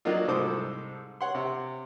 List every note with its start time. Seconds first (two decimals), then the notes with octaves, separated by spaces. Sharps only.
0.05 D#3 F#3 A#3 D4 D#4 F4
0.28 C2 G#2 A4 C5 D6 D#6
1.21 C#5 F#5 C6
1.35 C3